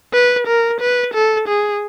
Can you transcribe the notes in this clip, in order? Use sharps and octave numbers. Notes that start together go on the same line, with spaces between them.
B4
A#4
B4
A4
G#4